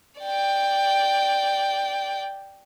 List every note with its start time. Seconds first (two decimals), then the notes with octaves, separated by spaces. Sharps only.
0.20 D5 G5